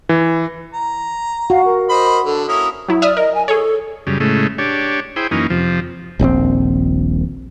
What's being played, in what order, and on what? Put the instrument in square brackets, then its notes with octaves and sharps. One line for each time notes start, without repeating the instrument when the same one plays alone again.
[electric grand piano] E3
[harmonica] A#5
[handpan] F#4 [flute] F5
[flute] A#4
[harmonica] C5 D#5 B5
[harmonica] D3 [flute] A4
[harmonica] A#3 C#4 E4 [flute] D#6
[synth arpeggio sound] F#3 E4
[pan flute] D5 [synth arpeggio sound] E5 D#6 F6
[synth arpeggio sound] A#4 [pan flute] D#5
[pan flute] G#5
[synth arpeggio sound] G#4 C#5 [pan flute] A4
[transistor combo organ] F#2 C#3 G3
A2 C#3 G#3 A3
D4 G4 C#5
E4 G#4 C5 G5
F#2 E3 A#3 C#4 D#4
F2 C3 F3
[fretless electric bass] D#1 A#1 B2 C4